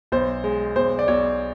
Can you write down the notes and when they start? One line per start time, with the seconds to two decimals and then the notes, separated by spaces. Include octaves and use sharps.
0.12 B1 C5
0.44 G#3
0.76 B1 C5
0.99 D5
1.08 B1 C#5